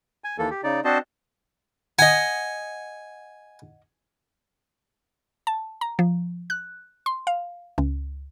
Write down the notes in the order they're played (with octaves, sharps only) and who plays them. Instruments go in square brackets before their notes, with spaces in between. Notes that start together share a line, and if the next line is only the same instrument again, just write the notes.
[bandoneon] G#5
D#2 E3 A#3 A4
G4
C#3 D#4 D5
C4 D4 F#4 C5 D#5 A5
[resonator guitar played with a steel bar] D#5 F#5 [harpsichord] G#5
[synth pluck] A5
A#5
F3
F#6
C6
F5
C#2